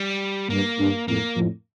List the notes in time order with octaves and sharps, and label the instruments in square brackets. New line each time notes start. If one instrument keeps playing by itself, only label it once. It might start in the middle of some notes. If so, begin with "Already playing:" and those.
Already playing: [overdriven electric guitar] G3
[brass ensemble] G2 [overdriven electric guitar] A#3
[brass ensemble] G2
[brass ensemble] F2 A2 [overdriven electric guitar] A#3
[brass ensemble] F2 A2